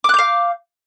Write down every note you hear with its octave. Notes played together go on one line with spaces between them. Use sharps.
F5 D6 F#6 G6